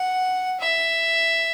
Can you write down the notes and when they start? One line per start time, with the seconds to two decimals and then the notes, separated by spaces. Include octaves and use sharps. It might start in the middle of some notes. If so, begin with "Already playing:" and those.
Already playing: F#5
0.60 E5